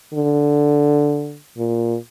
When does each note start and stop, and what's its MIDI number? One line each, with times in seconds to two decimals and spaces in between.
0.14 1.37 50
1.58 1.96 46